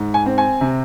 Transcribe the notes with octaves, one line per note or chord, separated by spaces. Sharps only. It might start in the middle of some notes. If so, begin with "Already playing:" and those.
Already playing: G#2
G#5
C4
G#5
C3